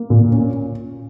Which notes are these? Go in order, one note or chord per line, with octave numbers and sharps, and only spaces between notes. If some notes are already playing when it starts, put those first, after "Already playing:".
Already playing: A#3
A#2
C#4